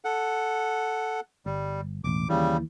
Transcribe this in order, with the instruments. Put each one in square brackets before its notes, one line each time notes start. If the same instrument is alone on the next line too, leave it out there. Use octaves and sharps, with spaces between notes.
[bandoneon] A4 F#5
[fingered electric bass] G1 [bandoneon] G3
[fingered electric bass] E1 A1 [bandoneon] D6
[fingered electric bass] D#2 E3 [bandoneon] C#3 G3